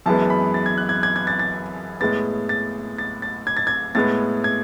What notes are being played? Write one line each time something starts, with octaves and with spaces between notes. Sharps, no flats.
F#2 E3 G#3 B3 A5
B5
A6
G#6
F#6
G#6
G#6
G#6
A6
A6
A2 G#3 B3 A6
A6
A6
A6
G#6
A6
G#6
A2 G#3 B3 A6
G#6